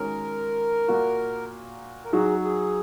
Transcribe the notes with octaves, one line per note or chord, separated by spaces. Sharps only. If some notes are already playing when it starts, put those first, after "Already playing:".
Already playing: D#3 G#3 C#4 F#4 A#4
A#2 A#3 F#4
A#4
F#3 D#4 F#4 G#4
G#4